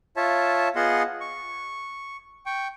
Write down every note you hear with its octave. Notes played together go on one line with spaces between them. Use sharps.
F4 C#5 E5 A5
B3 F4 G#4 D#5 F#5 C6
C#6
G5 C#6